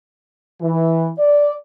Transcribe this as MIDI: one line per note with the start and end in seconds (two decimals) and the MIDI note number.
0.62 1.10 52
1.18 1.54 74